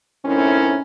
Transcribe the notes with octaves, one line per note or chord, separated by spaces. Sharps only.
F#2 A2 C4 C#4 D#4 E4